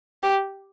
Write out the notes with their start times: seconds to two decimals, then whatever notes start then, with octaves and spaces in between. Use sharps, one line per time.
0.23 G4